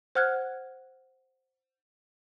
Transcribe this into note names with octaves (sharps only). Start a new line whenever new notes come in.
C5 F#5 F6 F#6 G#6